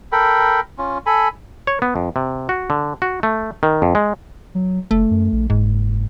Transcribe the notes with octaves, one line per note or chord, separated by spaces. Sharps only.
A4 A#4 G5 B5
C#4 F4
A4 G#5 B5
C#5
B3
F2
C3
F#4
D3
F#4
A3
D#3
F2
G#3
F#3
F#1 A3
F#2
A#1
F#1 G#2